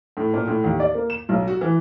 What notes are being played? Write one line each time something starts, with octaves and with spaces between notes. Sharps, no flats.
A2
A#2
A2
D#2
D5
A#3
E7
B1
F#4
E3